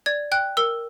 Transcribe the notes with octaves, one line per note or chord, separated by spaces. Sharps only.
D5 G#6
G5 F#6
A#4 E6